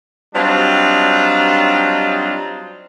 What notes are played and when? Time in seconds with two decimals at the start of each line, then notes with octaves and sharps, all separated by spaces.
0.34 F#3 G3 C4 D4 D#4 F4